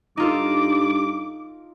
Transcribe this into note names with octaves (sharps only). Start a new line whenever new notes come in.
G2 D#4 F4 A4 D6